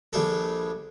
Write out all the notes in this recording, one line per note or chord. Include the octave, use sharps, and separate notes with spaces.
A#1 G3 G#4 A4